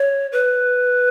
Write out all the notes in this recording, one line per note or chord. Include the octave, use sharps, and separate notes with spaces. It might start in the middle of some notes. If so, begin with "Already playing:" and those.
Already playing: C#5
B4